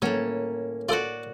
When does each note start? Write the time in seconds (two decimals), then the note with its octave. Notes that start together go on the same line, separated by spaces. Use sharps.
0.02 A2 F#3 A#3 C#4
0.89 F4 F#4 A4 C5 D5